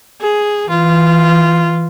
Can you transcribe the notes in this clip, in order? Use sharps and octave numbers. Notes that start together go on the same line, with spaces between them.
G#4
E3 F4